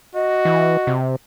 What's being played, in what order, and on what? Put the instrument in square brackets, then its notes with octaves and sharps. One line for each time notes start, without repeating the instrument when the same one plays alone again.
[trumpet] F#4 [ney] D#5
[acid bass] E3
C3